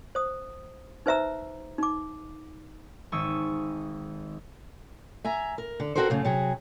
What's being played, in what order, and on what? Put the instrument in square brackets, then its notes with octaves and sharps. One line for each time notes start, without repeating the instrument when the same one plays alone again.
[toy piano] C5 D#6
D#4 B4 C5 E5 A#5 E6
D#4 D6
[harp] G#1 G#3 A5 C#6 D#6 E6
[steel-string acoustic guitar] E5 G#5 A#5
A#4
D3
C4 D4 F#4 A4 A#4 C5
F#2 C#3 A3
C3 F#3 G#4